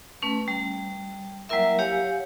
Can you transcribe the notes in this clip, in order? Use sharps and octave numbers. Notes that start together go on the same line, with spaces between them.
A3 C#4 B4
G3
F#3 G3 A#3 E4 A#4 E5
G4 C#5 F5 F#5 G#5